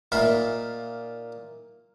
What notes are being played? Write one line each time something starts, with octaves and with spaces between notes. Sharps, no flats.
A#2 D#4 E5 F5